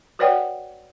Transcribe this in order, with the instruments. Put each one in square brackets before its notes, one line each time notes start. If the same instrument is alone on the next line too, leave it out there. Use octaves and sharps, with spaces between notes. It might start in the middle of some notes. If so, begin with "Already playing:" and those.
[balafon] F#4 B4 C#5 D5 F#5 G5